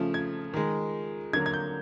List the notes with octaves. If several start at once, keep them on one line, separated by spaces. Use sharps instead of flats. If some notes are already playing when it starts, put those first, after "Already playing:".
Already playing: C#3 F3 A3
G#6
D#3 G#3
D3 F#3 A#3 G#6
G#6
G6